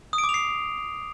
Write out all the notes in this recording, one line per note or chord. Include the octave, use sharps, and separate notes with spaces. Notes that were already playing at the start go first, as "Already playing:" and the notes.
D#6
D7
D6
F7
C7